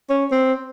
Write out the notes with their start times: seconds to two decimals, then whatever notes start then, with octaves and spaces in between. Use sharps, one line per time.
0.09 C#4
0.32 C4